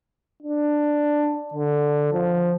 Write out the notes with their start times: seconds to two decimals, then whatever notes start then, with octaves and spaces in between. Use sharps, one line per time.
0.43 D4
1.54 D3
2.13 F3